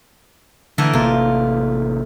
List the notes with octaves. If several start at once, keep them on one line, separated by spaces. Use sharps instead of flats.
D3 E3 A3 A#4
A1 C3 A#3 F4